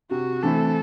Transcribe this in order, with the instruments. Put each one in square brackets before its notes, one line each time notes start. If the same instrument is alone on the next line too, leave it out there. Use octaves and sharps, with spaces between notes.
[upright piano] C3 [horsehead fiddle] F#4
[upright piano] E3 A3 C4 E4 [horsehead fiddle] A4